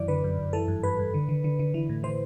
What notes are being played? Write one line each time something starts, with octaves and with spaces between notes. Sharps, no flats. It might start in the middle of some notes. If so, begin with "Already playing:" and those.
Already playing: F#2 E3 D5
D3 B4
F#2
F#2
E3 A4
G2
G2 B4
G2
D3
D3
D3
D3
E3
A2
E3 C5